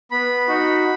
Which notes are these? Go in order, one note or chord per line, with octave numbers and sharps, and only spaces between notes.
B3 B5
D#4 F#4